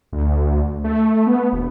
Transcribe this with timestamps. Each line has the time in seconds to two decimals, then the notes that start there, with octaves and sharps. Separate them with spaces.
0.13 D2
0.84 A3
1.27 B3
1.52 E1